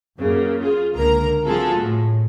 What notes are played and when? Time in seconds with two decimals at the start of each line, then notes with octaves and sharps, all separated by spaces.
0.18 F#2 C#3 A#3
0.59 F4 G#4
0.93 C#2 D3 A#3 A#4 A#5
1.45 F3 C4 F4 F#4 G#4 A4
1.75 A2